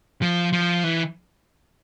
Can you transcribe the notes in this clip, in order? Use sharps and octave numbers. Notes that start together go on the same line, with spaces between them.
F3
F3
E3